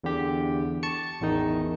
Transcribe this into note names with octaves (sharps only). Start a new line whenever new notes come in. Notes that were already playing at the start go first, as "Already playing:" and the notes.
E2 D3 G4
A5 C#6 C#7
A1 E2 D#3 D#4